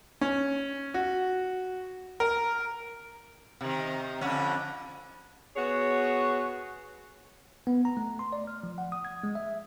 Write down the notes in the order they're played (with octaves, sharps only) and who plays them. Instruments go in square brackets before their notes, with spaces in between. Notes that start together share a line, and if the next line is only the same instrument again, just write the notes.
[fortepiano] C#4
F#4
A#4
[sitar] C3 D#3
F2 D3 C#4
[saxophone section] B3 F#4 G#4 C#5
[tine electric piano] B3
A#5
A3
C6
D5
F6
F3
F#5
D#6
G#6
G#3
E5